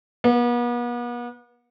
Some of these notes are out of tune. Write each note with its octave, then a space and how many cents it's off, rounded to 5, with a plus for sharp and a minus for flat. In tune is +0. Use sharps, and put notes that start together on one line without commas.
B3 -40